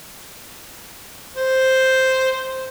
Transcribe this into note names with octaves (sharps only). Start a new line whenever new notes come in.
C5